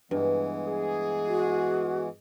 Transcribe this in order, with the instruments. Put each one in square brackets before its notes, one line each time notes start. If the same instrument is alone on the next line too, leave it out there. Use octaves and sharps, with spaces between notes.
[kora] G2 [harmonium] E3 G#3 B3
[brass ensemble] G#4
[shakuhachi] F#4